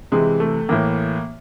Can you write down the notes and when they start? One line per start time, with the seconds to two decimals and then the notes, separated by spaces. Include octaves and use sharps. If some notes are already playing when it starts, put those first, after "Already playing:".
0.12 C3 E3 G#3
0.40 A3
0.69 A2 E3 A#3